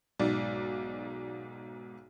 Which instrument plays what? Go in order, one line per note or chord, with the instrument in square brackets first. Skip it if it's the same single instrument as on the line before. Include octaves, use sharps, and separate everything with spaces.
[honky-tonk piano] B1 G#2 D5